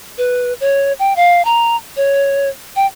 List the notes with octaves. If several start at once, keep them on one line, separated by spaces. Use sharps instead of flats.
B4
C#5
G5
F5
A#5
C#5
G5